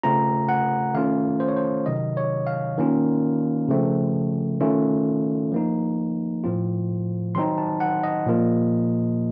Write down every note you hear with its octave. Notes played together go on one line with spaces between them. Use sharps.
C#3 A3 C4 F4 A#5
F#5
D#3 A3 C#4 F4 F5
C5
C#5
C5
C3 D#3 F#3 D#5
C#5
F5
D#3 A#3 C#4 F4
C#3 F3 A3 C4
D#3 A3 C#4 F4
F3 A#3 D#4
A2 F3 C4 F4
D#3 F#3 C4 D#4 C6
A5
F#5
D#5
A#2 F3 A#3 F4